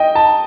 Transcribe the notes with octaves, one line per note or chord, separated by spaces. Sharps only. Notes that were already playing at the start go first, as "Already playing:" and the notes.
Already playing: D#5 G5
A5